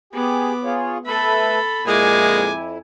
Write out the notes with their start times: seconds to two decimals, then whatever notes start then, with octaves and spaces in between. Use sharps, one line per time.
0.13 B3 G4 G#4 D6
0.64 F4 G#4 C#5
1.05 A3 A4 B4 E5 B5
1.87 F2 A#2 G#3 E4 G#5 D6